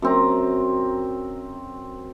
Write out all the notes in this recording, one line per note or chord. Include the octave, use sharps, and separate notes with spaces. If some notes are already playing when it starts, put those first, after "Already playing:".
F#2 C4 A#5